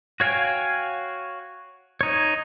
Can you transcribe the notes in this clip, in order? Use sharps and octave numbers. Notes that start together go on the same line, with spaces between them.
F#4 C#5 F5 G5 G#5
D#4 C#5